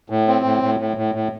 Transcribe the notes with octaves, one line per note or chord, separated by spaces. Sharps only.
A2
C4
A2
A2
A2
A2
A2